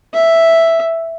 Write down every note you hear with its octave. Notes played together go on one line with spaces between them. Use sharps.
E5